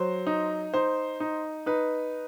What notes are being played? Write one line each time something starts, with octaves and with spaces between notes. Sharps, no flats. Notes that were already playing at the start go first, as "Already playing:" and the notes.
Already playing: F#3 C5
D#4
D#4 C5
D#4
D#4 B4